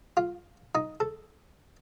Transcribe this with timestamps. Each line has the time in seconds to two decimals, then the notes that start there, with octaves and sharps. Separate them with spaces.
0.17 F4
0.75 D#4
1.00 A4